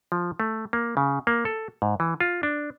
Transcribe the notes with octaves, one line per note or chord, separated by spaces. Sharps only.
F3
A3
A#3
C#3
A#3
A4
G#2
E3
F4
D4